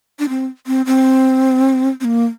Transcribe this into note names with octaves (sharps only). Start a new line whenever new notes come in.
D4
C4
C4
C4
C4
A#3